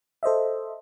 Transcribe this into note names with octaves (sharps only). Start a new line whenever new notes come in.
A4 C5 D#5 E5